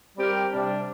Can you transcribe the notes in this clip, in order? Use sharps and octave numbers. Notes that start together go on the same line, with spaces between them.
G3 C4 G4 A#4
C3 G3 D4